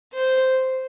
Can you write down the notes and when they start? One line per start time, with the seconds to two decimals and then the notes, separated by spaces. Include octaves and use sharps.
0.14 C5